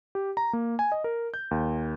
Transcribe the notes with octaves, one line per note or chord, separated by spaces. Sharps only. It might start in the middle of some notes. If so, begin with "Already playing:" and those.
G4
A#5
A#3
G#5
D#5
A#4
G6
D#2